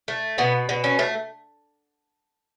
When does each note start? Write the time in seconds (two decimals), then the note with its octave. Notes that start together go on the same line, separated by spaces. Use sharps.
0.08 A3
0.38 B2 B3
0.69 B2
0.84 C#4
0.99 A3